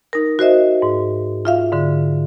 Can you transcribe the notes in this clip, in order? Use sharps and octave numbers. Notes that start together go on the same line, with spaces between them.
D#4 A#4
F#4 C5 D#5 E5
G#2
F4 E5 F5
G#2 D3